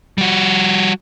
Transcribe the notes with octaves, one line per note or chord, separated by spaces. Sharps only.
G3 F#4